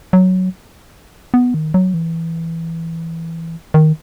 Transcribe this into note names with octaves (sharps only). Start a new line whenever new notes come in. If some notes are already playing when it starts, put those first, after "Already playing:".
F#3
B3
D#3
F#3
E3
D#3